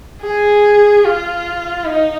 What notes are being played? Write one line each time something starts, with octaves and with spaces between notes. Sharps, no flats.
G#4
F4
D#4